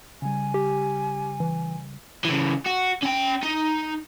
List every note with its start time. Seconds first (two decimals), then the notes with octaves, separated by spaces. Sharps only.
0.22 C#3 G3 G#5
0.54 G4
1.40 E3
2.24 C#3 E3
2.66 F#4
3.02 C#4 G5
3.43 D#4